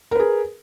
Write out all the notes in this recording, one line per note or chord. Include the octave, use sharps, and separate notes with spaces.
G#4 A#4 B4